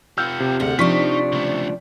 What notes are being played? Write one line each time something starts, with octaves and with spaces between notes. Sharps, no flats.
F4 G4 E6 F6 G6
C3
D2 C#3 G#4 F#5
C3 F3 D4 D#4 D5 C#6 B6
C#3 A3